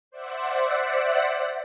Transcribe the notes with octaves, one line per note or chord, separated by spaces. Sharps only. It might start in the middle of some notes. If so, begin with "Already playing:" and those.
C5 D5 E5 F#5